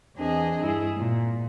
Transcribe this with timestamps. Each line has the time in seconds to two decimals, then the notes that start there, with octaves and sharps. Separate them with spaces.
0.16 E2 C4 D4 G#4 D#5
0.62 G2 E4 G#4
0.97 A#2